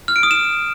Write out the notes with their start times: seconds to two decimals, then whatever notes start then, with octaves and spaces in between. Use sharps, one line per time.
0.08 F6
0.16 D7
0.23 D#6
0.31 E7